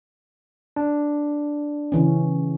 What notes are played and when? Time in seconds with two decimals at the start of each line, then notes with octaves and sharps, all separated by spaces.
0.76 D4
1.92 C#3 E3 C#4